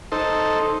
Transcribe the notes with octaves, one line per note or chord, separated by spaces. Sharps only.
D#4 A4 C5